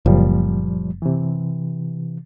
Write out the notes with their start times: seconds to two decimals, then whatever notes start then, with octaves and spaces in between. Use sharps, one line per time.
0.06 F#1 A#2 F3 G3
1.02 C3 E3